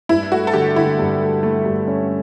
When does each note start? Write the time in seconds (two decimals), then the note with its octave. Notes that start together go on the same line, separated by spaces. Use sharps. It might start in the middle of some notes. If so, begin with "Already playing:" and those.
0.09 G2 E4
0.32 A3 F#4
0.47 A4
0.53 D3 G4
0.76 D3 E4
0.99 G2
1.21 A3
1.43 A3
1.65 G2
1.87 C#4